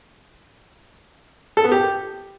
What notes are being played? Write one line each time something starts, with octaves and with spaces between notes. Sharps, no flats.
A4
B3
G4